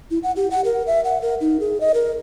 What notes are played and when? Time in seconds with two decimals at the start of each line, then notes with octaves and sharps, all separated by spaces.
0.11 E4
0.23 F#5
0.36 G4
0.51 F#5
0.65 A#4
0.87 E5
1.04 F#5
1.22 A#4
1.41 D#4
1.60 G#4
1.80 D#5
1.94 A#4